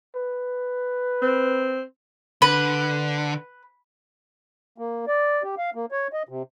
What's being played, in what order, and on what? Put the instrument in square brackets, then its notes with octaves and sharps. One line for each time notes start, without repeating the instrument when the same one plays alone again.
[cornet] B4
[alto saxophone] C4
[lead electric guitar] D3 [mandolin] B4
[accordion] A#3
D5
G4
F5
A#3
C#5
D#5
C3